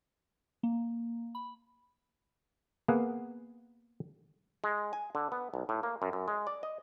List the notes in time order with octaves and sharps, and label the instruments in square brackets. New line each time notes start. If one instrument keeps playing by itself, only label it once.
[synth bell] A#3
B5
[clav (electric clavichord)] A#3 B3 G#4 F5 F#5
G#3
G#5
D3
B3
B1
A2
A#3
F#2
F#2
G#3
D5
D#5